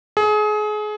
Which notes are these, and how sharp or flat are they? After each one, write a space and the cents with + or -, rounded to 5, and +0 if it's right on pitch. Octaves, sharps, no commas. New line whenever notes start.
G#4 +30